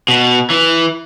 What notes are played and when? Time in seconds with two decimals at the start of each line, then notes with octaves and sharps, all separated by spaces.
0.08 B2
0.50 E3